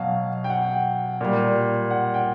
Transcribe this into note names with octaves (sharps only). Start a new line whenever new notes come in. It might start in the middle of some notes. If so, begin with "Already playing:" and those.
Already playing: B2 F#3 F5
G5
F#5
A#2 G3
F#5
G5